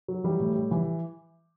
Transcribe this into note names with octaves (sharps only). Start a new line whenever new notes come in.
F#3
E3 G3 G4
A2
G3
E3